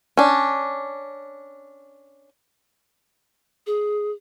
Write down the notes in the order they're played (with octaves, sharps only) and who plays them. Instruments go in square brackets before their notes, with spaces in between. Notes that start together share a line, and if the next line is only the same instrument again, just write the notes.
[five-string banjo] C#4 D4
[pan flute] G#4